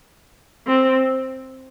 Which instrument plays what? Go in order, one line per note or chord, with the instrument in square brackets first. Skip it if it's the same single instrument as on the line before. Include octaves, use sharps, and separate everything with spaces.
[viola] C4